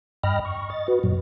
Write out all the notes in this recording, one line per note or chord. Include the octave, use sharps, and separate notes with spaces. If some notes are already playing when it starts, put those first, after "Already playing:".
G2 D#5 G5 B5 F6 A#6
C#6
D#5 A6
F#4 B4
F#2 A#2 F#3